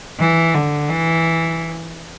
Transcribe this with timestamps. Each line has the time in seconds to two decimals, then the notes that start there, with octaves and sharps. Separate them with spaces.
0.20 E3
0.54 D3
0.89 E3